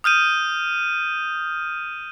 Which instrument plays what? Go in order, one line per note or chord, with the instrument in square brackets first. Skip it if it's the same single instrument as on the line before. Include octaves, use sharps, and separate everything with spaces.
[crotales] D#6 F6 G6 D#7